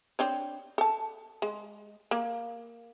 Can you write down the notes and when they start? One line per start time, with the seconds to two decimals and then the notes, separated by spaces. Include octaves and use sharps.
0.19 C4 D4 C#5
0.78 A4 A5
1.42 G#3
2.11 A#3